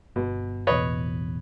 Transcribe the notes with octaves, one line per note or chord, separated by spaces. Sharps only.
G1 B2
A1 E2 B2 B4 C#5 D#5